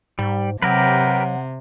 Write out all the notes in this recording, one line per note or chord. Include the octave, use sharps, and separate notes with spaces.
G#2 G3
C3 F#3 G4 A#4 B4 F#5